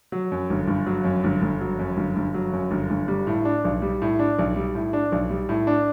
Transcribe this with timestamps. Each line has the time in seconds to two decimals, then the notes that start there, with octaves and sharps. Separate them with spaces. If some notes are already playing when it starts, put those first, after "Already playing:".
0.12 F#3
0.32 F#2
0.50 G1
0.68 G1
0.86 F#3
1.04 F#2
1.24 G1
1.42 G1
1.61 F#3
1.79 F#2
1.97 G1
2.16 G1
2.34 F#3
2.53 F#2
2.71 G1
2.90 G1
3.08 G3
3.27 A2
3.45 D4
3.65 B1
3.82 G3
4.02 A2
4.19 D4
4.39 B1
4.56 G3
4.75 A2
4.93 D4
5.12 B1
5.30 G3
5.49 A2
5.67 D4